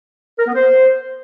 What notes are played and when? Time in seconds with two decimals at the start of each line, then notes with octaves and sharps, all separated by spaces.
0.38 A#4
0.47 B3
0.55 C5